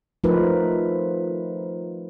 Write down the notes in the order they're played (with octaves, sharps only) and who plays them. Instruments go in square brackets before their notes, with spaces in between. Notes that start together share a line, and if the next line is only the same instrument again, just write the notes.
[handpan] F3 A3 D#4 F4 A#4 B4